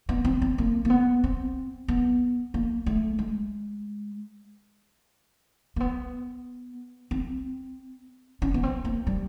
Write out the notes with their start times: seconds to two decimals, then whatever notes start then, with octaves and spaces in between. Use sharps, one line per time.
0.09 B3
0.25 C4
0.42 C4
0.58 A#3
0.85 A#3
0.90 B3
1.24 C4
1.88 B3
2.54 A#3
2.86 A3
3.19 G#3
5.76 A#3
5.80 B3
7.11 C4
8.42 C#4
8.54 B3
8.63 C4
8.85 A#3
9.07 G3